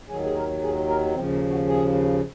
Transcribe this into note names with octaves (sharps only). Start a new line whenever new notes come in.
D#2 D#3 F#3 G#4
G#4
A#4
G#4
A#4
D#2 C#3 F3 C4
A#3
F#4
G#4